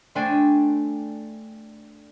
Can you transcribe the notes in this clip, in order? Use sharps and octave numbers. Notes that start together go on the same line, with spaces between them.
A3 D4 C5 D5 G5 G#5